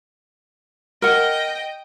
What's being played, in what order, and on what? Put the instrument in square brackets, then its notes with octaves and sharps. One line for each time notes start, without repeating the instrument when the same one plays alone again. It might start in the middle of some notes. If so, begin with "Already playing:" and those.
[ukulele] A#4 F#5 [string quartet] D#5 G5